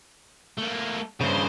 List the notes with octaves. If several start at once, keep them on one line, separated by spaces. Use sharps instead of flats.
A3 A#3
G2 C#3 C5